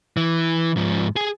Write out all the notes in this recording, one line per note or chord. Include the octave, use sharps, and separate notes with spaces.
E3
G#2 F3
G#4 G#5